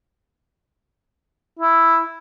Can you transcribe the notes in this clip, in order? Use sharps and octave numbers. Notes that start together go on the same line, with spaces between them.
E4